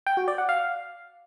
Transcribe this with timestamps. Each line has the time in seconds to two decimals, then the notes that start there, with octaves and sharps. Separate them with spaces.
0.07 G5
0.17 F#4
0.28 D5
0.38 F#5
0.49 F5